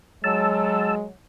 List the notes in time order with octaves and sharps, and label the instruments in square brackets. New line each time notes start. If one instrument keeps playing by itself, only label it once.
[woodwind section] F#3 [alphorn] G#3 [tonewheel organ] A5 E6